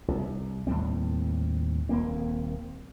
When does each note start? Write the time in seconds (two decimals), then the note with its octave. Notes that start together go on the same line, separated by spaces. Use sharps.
0.08 C2
0.67 D#2 A2 G3 C4
1.89 D#1 A#3 C4